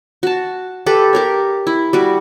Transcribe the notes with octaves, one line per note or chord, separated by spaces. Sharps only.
F#4 A5
G4 A4 B4
G4 A#4 C#5
E4
G3 F#4 D6